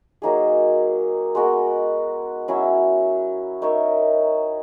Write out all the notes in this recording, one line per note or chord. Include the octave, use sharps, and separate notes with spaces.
F#3 A#3 D#4 G#4
G#3 B3 F#4 A#4
F#3 C#4 E4
D#4 A#4 C#5 E5